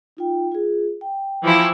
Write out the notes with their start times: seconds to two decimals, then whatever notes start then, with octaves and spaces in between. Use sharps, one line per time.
0.17 D#4 F4 G5
0.52 F4 G#4
1.01 G5
1.43 E3 F3 E4